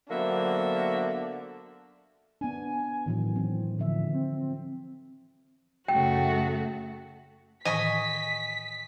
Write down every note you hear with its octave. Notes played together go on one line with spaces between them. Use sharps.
D3 F#3 A#3 B3 F#4 C5 E5
B3 D4 G#5
A2 D#3 E3 F#3
E3 C4
D3 F3 E5
C4
F#2 C#3 A3 F#4 G5
A2 D#3 E3 D#5 G#5 C#6 B6